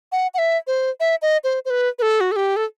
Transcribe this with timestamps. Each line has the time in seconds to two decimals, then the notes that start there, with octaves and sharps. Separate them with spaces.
0.12 F#5
0.34 F#5
0.38 E5
0.67 C5
1.00 E5
1.22 D#5
1.44 C5
1.65 C5
1.70 B4
1.99 B4
2.02 A4
2.21 F#4
2.32 A4
2.36 G4
2.56 A4